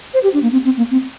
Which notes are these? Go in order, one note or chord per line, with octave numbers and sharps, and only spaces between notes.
C5
G4
D4
A#3
C4
C4
A#3
C4